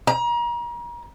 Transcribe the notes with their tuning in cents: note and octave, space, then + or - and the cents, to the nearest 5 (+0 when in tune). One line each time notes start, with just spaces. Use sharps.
A#5 +35